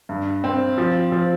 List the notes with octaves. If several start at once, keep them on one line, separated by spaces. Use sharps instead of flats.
G2
C4
F3
F3